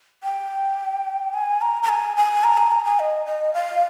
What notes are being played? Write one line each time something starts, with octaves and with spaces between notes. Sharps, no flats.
G5
G#5
A#5
A#5
G#5
G#5
A#5
G#5
A#5
G#5
D#5
D#5
F5